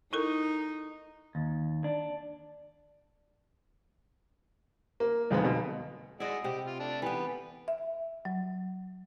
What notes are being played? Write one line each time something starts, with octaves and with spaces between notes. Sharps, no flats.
D#4 E4 A4 A#4
D#2
D4
A#3
B1 F2 G#3 B3
B2
G#3 E4 F#4 D5 D#5
C3 G4
F4
A3 D4
E3 B3 G4 B4
E5
F#3